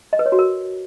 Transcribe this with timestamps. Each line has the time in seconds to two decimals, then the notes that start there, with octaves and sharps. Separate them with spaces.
0.13 D#5
0.19 B4
0.26 C#5
0.32 F#4
0.39 A#4